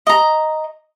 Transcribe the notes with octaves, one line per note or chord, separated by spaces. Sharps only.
D#5 A#5